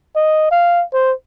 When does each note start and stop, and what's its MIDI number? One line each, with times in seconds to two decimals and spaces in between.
0.16 0.48 75
0.51 0.84 77
0.94 1.13 72